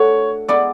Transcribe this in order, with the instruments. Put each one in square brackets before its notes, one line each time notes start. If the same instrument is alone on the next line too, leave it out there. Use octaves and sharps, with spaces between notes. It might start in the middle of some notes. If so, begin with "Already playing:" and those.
Already playing: [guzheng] A3 D4 F#4 [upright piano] C#5 C#6
[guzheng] G#3 B3 E4 [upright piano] D5 D6